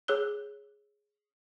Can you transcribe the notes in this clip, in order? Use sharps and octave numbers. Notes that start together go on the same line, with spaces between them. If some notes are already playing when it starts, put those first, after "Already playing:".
G#4 C#5 E6 F#6 G7